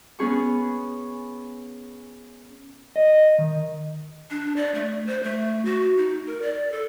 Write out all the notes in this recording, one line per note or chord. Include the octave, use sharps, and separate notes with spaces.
B3 C#4 G#4 C#6
D#5
D#3
D4
D5
A3
C5
A3
F#4
D#4
A#4
D5
A4